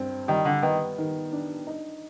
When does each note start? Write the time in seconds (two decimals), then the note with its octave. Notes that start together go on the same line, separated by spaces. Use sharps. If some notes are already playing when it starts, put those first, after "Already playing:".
Already playing: G2 C4
0.28 D#3 G3
0.45 D3
0.63 D#3 B3
0.98 D#3
1.33 D4
1.67 D#4